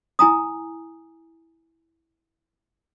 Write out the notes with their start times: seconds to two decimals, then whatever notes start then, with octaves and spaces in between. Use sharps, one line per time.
0.19 E4 G#5 A#5 D#6